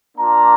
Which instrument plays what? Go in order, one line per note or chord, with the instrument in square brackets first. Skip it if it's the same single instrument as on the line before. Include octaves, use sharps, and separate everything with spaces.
[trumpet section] A#3 D4 F4 A#5